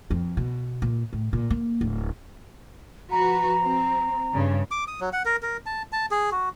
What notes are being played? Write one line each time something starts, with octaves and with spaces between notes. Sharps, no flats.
F2
B2
A#2
A2
A#2
A#3
D1
F3 F#4 B4 A#5
C4
G2 C#3
D6
D#6
F#3
F#5
A#4
A#4
A5
A5
G#4
F#4